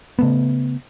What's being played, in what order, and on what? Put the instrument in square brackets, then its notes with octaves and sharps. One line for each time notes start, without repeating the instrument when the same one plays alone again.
[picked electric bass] C#3 A3 B3